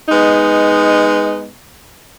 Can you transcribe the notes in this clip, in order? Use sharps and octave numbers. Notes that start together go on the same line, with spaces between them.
G#3 B3 D#4